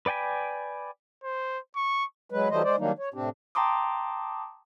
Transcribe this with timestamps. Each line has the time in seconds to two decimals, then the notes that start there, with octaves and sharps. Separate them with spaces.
0.06 B4 D5 G5 G#5 B5
1.24 C5
1.76 C#6
2.30 F#3 G#3 B4
2.50 E3 F#3 G3 A3 C5 D#5
2.64 G#3 C5 D5
2.79 D#3 F#3 G3 A#3 D4 D#4
2.99 C#5
3.14 A2 C3 C4 D4 G4
3.55 G5 A5 A#5 C6 D6 D#6